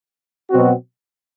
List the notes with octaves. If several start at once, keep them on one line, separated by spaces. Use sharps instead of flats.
B2 F#3 C4 F#4